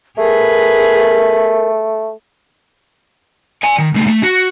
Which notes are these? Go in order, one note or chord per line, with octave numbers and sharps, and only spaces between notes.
A3 G#4 A#4 B4
D5 G#5
D#3
C#2 A3
A3
F#4